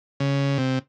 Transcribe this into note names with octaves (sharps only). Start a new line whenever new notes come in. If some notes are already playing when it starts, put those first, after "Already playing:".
C#3
C3